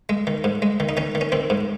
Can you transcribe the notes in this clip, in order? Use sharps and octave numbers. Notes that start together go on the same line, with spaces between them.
G#3
D#3
G#2
G#3
D#3
D#4
D#3 C#4
D#3
C#4
D#3 C4
G#2